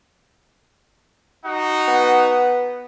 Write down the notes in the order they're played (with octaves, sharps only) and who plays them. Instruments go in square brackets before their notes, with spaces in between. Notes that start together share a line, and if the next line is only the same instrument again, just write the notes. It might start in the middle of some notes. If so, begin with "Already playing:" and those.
[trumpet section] D#4 F#4 F#5
[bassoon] B3